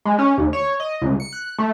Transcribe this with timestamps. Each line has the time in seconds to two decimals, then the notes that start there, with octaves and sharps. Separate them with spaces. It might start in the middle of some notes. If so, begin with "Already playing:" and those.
0.05 G#3
0.19 C#4
0.37 D#2
0.53 C#5
0.80 D#5
1.02 C#2
1.20 C#7
1.33 F#6
1.58 A3